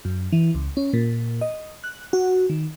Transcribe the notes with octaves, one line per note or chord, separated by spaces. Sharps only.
F#2
E3
C#2
C#4
A#2
D#5
F#6
F#4
D#3